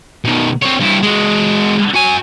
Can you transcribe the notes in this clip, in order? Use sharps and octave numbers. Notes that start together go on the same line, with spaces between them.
B2 D#3
C4 C#5
G2 E4
G#3 F#4
F#4 G#5